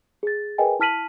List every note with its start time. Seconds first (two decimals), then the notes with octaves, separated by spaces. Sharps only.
0.23 G#4 A6
0.58 G#4 A#4 B4 D#5 G5 G#5
0.79 E4 A5 F6 B6 D#7 F#7